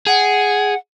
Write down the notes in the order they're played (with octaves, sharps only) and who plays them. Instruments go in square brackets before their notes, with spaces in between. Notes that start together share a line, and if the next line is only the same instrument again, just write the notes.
[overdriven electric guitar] G#4 [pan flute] F#5